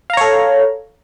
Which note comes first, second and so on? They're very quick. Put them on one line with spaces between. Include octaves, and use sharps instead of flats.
F5 A#5 C#5 A4